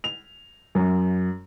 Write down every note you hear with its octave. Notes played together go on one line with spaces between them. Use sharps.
F7
F#2